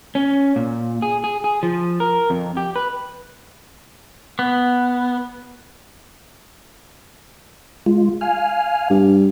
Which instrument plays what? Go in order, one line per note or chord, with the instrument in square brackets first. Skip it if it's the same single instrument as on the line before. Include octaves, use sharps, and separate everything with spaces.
[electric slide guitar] C#4
A#2
G#4
G#4
G#4
F3
A#4
F2
G4
B4
[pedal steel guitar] B3
[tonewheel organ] G#3 F4
F5 G#5 F6
[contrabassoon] G2